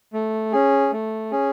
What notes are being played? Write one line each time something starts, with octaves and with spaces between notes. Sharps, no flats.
A3
C#4 G#4
A3
C#4 G#4